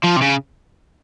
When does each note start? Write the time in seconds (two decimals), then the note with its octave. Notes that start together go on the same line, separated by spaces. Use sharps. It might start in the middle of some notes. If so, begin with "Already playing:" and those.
0.04 F3
0.16 C3
0.21 C#3